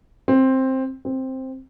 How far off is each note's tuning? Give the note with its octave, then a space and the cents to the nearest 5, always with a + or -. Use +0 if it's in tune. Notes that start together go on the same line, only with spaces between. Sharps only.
C4 +10
C4 +5